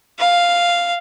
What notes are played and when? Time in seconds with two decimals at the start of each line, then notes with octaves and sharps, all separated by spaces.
0.18 F5